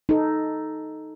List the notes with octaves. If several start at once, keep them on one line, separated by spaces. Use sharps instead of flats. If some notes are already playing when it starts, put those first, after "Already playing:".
D#4 A4